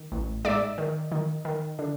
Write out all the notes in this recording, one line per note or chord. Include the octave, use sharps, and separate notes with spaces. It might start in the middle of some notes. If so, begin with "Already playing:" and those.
Already playing: D#3
A1
G#2 D5 E5
D#3
D#3
D#3
D3